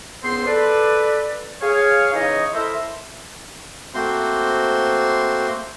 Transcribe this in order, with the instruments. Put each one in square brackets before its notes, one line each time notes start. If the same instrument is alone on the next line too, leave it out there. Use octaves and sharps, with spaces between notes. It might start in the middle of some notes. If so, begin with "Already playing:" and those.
[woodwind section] C#2 G#2 B3 C4 C5 C6
A4 B4 D5
G#4 C#5 F5
C#3 E3 D#4 C#5 D#5
E4 A4 A#4 C5 E5
[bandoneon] A3 A#3 C4 F#4 C5 C6